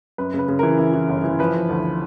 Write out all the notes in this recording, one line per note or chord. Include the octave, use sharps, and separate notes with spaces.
F#2 B4
C#3
B4
C#3
E3 A#4
E3
E3
G1
E3
F3 B4
F3
D2